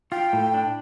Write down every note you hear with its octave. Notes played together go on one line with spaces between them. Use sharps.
F4 G5
A2
D4